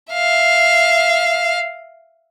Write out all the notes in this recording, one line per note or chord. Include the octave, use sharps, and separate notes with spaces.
E5 F5